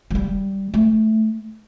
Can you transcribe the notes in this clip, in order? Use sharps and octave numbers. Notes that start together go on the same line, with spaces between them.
F#3
G3
A3